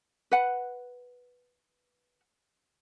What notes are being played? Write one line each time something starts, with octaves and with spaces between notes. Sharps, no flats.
B4 F#5